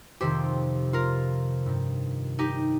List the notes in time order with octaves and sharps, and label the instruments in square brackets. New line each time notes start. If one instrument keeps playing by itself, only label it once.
[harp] F2 C3 D#3 G4 C5
F4 A#4
G2 D#3
D#4 G4